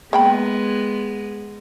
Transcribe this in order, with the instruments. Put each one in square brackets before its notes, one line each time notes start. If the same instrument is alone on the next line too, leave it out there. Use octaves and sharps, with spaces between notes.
[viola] G#3 B3 [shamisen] A#3 G5 B5